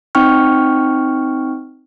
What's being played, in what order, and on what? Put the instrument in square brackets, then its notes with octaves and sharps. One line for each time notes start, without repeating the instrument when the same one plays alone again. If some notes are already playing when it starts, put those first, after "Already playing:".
[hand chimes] C4 D#4 G5 C#6 F6